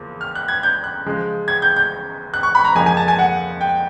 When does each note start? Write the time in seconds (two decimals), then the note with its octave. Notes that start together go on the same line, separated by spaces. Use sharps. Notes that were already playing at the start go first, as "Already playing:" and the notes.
Already playing: E2 C#3 F3 A#3
0.21 F6
0.35 F#6
0.48 G#6
0.63 G6
0.84 F#6
1.06 C#3 F3 G#3
1.48 G#6
1.62 G6
1.76 G6
2.34 F#6
2.43 C#6
2.55 B5
2.64 A#5
2.75 F2 C#3 F3 A#3 G#5
2.86 G#5
2.97 A5
3.08 G#5
3.19 F#5
3.61 G5